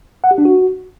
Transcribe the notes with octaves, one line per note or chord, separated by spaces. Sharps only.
F#5
G4
D4
F#4